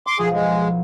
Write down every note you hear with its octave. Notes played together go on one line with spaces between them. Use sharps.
C6 D6
B1 F3 G#4
G#3